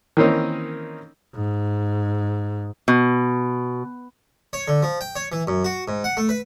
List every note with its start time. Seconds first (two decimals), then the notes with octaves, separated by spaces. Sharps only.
0.17 D#3 E3 A#3 C4 C#4 D#4
1.35 G#2
2.88 B2
4.53 C#5
4.68 D3
4.83 F3
5.01 G5
5.16 C#5
5.32 E3
5.47 F#2
5.64 F#4
5.88 G#2
6.04 F#5
6.17 A3
6.29 B4